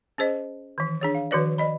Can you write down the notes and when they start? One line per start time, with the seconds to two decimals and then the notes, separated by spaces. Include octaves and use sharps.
0.18 C#4 G#4 C5 D#5
0.78 D#3 E3
1.01 D4 G#4 C#5
1.15 F5
1.31 D#3 F3 F#4 B4 C#5 D5
1.58 D5 D#5 B5